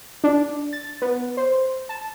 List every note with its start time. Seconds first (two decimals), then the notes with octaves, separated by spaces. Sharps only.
0.24 D4
0.73 A6
1.02 B3
1.37 C5
1.89 A5